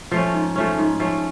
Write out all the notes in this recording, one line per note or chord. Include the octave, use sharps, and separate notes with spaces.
F3 A3 C#4
G#2
F3 A3 C#4
G#2
F3 A3 C#4